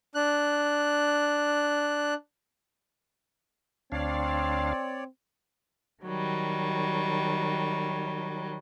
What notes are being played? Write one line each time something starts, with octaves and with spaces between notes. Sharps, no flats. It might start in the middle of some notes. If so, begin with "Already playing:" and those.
D4 F#6
D2 C4 D4 C#5 D5 F5
D#3 F#3 G3